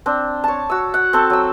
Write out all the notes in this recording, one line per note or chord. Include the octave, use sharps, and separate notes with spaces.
C4 D4
C#5 A5
F#4 E6
F#5
C4 A4 A5
F#3 E6